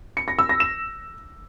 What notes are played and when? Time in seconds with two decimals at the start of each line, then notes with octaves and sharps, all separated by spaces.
0.17 C#7
0.28 A#6
0.39 E6
0.49 A#6
0.60 E7